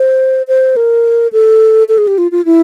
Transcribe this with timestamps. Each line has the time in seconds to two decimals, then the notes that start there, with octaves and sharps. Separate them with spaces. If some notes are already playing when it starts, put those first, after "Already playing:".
Already playing: C5
0.48 C5
0.76 A#4
1.33 A4
1.89 A4
1.98 G#4
2.07 G4
2.18 F4
2.32 F4
2.45 E4